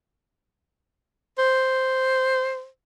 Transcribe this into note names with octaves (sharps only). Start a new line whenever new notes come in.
C5